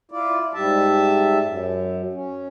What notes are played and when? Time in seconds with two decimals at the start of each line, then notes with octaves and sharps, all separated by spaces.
0.12 E4 F4 D5
0.54 G#2 G3 E5 A5
1.43 F#2
2.13 C#4